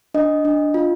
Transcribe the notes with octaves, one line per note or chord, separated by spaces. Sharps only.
D4 D#5
D4
F4